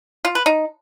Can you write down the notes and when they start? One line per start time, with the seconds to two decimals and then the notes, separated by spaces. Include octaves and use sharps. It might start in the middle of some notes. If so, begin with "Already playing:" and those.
0.25 F4
0.35 B4
0.46 D#4